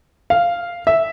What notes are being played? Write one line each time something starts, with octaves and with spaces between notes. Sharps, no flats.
F5
E5